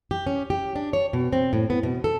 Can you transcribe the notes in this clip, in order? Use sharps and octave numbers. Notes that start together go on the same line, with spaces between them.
G4
C#4
G4
D4
C#5
B2
C4
A2
B3
B2
A4